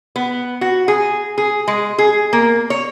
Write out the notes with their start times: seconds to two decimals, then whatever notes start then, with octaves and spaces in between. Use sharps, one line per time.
0.16 B3
0.61 F#4
0.88 G#4
1.38 G#4
1.68 G#3
1.98 G#4
2.33 A#3
2.70 C#5